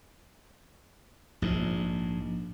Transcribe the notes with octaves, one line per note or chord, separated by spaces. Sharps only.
A#1 G#2